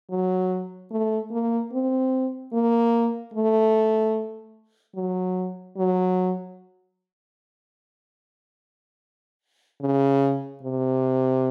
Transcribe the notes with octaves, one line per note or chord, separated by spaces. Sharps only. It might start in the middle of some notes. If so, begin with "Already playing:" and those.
F#3
A3
A#3
C4
A#3
A3
F#3
F#3
C#3
C3